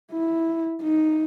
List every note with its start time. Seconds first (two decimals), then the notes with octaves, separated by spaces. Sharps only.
0.12 E4
0.83 D#4